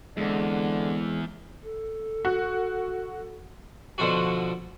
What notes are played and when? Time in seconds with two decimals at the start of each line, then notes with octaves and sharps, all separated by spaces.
0.17 E2 D3 G#3 C4
1.62 A4
2.25 F#4
3.98 B2 D3 F3 F4 F#4